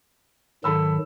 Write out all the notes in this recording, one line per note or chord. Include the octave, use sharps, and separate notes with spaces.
G#2 D#3 F#3 A4 B5 E6